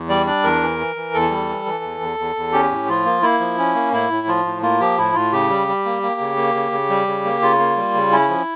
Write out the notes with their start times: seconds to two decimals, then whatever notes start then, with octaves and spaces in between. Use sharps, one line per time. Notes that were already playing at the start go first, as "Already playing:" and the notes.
Already playing: E2
0.09 G3 D5
0.27 D4 D5
0.43 E2 A#4
0.61 E3
0.79 E3
0.96 E3
1.14 E2 A4
1.30 G3
1.49 E3
1.66 E3
1.84 E2
2.00 E2
2.19 E2
2.36 E2
2.53 C#4 G4
2.71 A2
2.88 F3 F4
3.05 A#3
3.22 A#3 E4
3.40 F3
3.58 C#4
3.75 A#3
3.92 A2 E4
4.11 A2
4.27 F3 F4
4.45 A2
4.62 A#3 F4
4.80 F3 G4
4.98 A2 E4
5.15 A2 F4
5.32 C#3 G4
5.50 G3
5.68 G3
5.85 A#3
6.03 A#3
6.20 C#3
6.36 A#3
6.55 C#3
6.72 C#3
6.90 G3
7.07 C#3
7.25 A#3
7.41 C#3 F4
7.59 A#3
7.77 G3
7.95 C#3
8.12 C#4 E4
8.28 F3